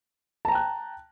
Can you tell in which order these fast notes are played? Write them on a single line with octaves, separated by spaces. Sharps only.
A5 A#5 G5 F#6